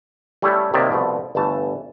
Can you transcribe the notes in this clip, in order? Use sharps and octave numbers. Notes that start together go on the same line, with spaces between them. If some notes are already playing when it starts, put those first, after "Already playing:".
G3 A3 C#4 E4 G4 A4
C3 D#3 F#3 A#3 D5 E5
C2 B2 F3 A3
G1 E3 A3 A5